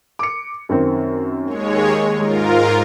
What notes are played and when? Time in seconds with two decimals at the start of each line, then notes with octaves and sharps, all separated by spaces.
0.19 D6 C#7
0.69 F#2 D#3 C4
1.45 D#2 G#3 C#5
1.76 G#4
2.20 G#2 G#3 F4 A#4